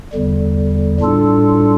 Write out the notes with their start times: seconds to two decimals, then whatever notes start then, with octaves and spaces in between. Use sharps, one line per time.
0.12 E2 D3 G3
1.00 A2 G3 D4 F4 A4